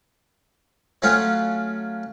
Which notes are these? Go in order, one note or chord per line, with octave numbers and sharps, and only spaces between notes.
F#3 A3 C#4 F4 F5 F#5